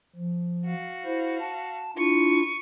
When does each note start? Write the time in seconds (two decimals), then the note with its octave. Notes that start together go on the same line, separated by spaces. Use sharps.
0.16 F3
0.65 F#4 F5
1.05 E4 C5
1.40 A5
1.97 D4 E4 F4 C#6 D#7